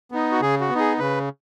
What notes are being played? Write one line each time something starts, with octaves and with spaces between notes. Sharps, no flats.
B3 D#4
F#4
C#3 G#4
F#4
B3
D#4 G#4
C#3 B4